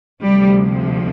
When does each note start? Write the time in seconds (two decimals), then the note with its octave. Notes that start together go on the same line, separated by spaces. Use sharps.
0.23 D2 C3 F3 G3